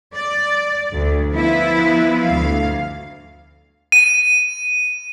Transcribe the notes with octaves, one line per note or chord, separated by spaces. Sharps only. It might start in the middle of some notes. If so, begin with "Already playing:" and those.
D5
D2
F3 B3 E4 B4
D2 F5
D#7